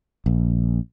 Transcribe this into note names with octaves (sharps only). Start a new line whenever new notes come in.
A#1